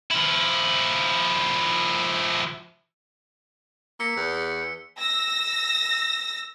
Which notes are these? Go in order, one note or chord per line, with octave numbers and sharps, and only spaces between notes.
F3 E4
A#3 E6 B6 C#7
E2
E6 A#6